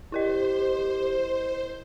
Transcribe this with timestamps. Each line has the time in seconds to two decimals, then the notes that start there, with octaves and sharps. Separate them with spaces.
0.12 E4 G4 A#4 C5 D#5